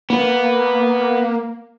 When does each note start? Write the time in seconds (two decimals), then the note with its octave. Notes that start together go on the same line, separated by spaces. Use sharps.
0.10 A#3 B3